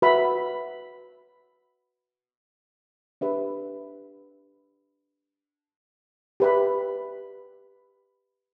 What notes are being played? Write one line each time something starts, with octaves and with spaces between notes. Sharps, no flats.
F#4 B4 E5 B5
D4 G4 B4 E5
G4 B4 E5 B5